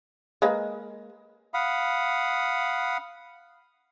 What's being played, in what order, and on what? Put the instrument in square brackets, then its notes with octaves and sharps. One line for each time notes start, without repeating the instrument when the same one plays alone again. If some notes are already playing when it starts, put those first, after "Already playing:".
[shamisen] G#3 A#3 B4
[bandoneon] F5 F#5 B5 D#6